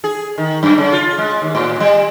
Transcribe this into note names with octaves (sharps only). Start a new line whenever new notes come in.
G#4
D#3
F#2
C#3
F4
G#3
D#2
A2
G3